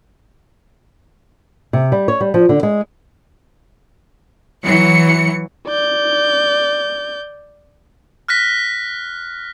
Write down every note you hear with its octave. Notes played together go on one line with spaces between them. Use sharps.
C3
G3
C#5
G3
F3
D3
G#3
E3 F#3 C#7
D5 G6
F6 F#6 A#6 B6